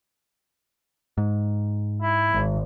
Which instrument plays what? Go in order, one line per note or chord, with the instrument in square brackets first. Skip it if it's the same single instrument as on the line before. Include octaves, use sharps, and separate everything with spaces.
[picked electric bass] G#2
[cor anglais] E4
[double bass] G#1